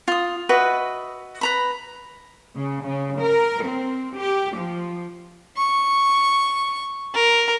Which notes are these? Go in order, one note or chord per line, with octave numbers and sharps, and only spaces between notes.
F4 D#6
F#4 B4 D#5 E5
B4 A#5 B5
C#3
C#3
A#4
C4
G4
F3
C#6
A#4